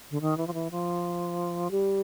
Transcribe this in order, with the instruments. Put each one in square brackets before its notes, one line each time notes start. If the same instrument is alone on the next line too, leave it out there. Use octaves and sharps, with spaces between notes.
[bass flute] D3
D#3
E3
F3
E3
F3
G3